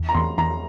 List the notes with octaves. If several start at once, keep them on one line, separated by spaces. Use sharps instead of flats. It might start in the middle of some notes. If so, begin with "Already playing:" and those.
Already playing: E2
A#5
E2 C6
E2 A#5